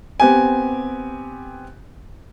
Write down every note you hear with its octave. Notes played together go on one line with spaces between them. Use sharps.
B3 C4 G4 G#5